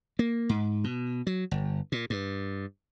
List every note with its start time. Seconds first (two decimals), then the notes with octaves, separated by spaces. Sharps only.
0.19 A#3
0.49 G#2
0.84 B2
1.27 F#3
1.51 G1
1.92 A#2
2.10 G2